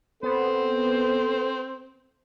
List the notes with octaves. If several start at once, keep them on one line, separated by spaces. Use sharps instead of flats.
B3 C4 A4 C5